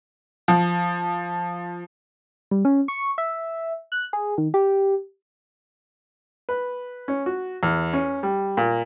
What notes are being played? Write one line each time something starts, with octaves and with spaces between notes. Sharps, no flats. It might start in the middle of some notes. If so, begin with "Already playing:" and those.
F3
G3
C#4
C#6
E5
F#6
G#4
D#3
G4
B4
C#4
F#4
E2
C#4
G3
A#2